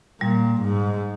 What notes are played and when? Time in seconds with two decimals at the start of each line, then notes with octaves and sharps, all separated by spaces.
0.20 A#2 G3
0.62 G#2